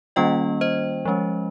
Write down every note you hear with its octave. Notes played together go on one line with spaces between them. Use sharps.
D#3 G3 A#3 C#4 F4 D#5 G5
C5 D#5
F3 G#3 C#4